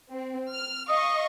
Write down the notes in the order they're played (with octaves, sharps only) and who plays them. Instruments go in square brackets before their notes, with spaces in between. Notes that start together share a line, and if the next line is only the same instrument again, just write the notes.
[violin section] C4
F6
[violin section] D#5 F5 C#6 [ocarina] D#6